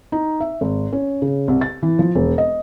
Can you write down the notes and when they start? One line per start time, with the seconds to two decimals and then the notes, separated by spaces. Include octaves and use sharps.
0.12 D#4
0.40 E5
0.61 G#1
0.93 C#4
1.22 C#3
1.48 C2
1.61 A6
1.83 E3
1.99 F3
2.15 E1
2.38 D#5